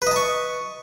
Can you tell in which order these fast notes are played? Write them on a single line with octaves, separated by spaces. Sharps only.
B4 D#5 A5 C#6